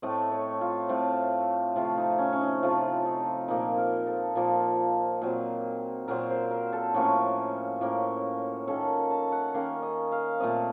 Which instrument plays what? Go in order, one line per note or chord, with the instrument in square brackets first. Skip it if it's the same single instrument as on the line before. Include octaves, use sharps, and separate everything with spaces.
[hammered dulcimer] A2 A3 C4 D#5
C#5
F4
A2 A3 C4
C3 F3 A3 C4 F4
D#4
C#4
C#4
D#4
C3 F3 A3 C4 F4
D#4
A#2 F3 A#3 D#4
A#4
A4
A#2 F3 A#3
A#2 F#3 C4
A#2 F#3 C4 A#4
C5
A#4
A4
A2 F3 A#3 C#4 F#4
A2 F3 A#3 C#4
D#3 A#3 C#4 A4
A5
F#5
D#3 A#3 C#4 F5
D#5
F5
A#2 A3 C4 D#5